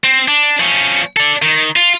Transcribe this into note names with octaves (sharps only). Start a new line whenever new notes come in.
C4
D4
F3 C#4
A4 D5
D#3
F4